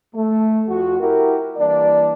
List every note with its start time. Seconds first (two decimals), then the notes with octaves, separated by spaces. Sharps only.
0.14 A3
0.67 F2 F#4
0.99 E4 F#4 G4 A#4
1.57 E3 G3 A#3 D4 D5